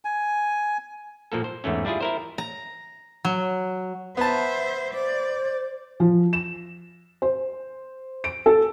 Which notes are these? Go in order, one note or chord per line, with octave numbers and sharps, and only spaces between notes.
G#5
A#2 F3 A#3 A4
C5
E2 G#2 E3 A3 C#4
G3 D4 E4 F4 G#4
E4 A#4 C5
A#5
F#3
B3 C5 E5 A5
C5 D5
F3
E7
C5
D7
A4